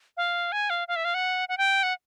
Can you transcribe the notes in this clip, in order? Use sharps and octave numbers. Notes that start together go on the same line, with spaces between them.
F5
G#5
F5
F5
E5
F5
F#5
F#5
G5
F#5